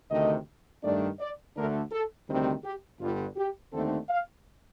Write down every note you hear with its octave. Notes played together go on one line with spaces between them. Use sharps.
D2 C3 D#3 A3 D#5
G2 D#3 A3 D4 D5
D5
D2 D3 A3 D4 A#4
A4
D2 C3 D#3 G3 C4
G4
G1 G2 D3 G3 F4
G4
D#2 D3 A3 C4 D#4 A4
F5